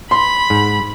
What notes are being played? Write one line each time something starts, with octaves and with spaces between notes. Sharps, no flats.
B5 C6
G#2